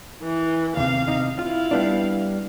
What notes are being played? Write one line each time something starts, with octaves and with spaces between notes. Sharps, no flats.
E3
D#2 C3 F5
C3 D#4
E4 F4 F5
G3 B3 D4